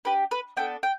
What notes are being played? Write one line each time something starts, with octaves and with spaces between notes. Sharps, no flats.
D4 G4 B4
B4
B3 D4 A4 G5
G5